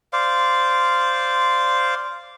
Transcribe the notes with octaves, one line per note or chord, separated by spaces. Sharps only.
C5 D5 F5